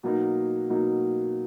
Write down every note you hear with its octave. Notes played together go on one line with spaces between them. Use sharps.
B2 F#3 A#3 D#4
B2 F#3 A#3 D#4